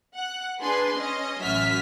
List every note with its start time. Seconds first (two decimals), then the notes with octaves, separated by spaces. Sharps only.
0.15 F#5 F#6
0.61 D4 G#4 B4 G#5 C6
0.98 C#4 D#5
1.42 A1 F#2 C#4 E5 F6 B6